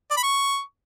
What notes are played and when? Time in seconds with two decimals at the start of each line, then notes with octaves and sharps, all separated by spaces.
0.11 D5
0.17 B5
0.23 C#6